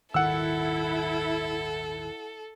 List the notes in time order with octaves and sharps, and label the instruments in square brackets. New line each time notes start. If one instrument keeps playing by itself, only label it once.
[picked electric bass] D#1 G#1 D#3 [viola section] E4 [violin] A4 [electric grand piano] F#5 E6